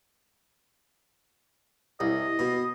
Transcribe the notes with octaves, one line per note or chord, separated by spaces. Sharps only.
C2 D#5
B2